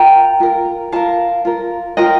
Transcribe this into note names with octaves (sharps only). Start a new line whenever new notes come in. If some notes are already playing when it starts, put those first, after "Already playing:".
Already playing: F4 A#4 G5 A#5
F4 A#4
F4 A#4 F5 A5
F4 A#4
F4 A#4 D#5 G5